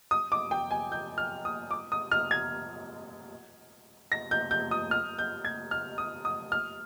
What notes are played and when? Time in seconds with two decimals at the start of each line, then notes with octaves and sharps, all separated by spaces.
0.11 D#6
0.32 D6
0.51 G5
0.71 G#5
0.92 G6
1.18 F6
1.45 D#6
1.71 D6
1.92 D#6
2.12 F6
2.31 G#6
4.12 A#6
4.31 G6
4.51 G6
4.71 D#6
4.91 F6
5.18 G6
5.45 G#6
5.71 F6
5.98 D#6
6.25 D#6
6.52 F6